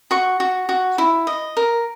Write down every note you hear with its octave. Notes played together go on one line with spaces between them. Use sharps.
F#4 C#6
F#4
F#4
E4
D#5
A#4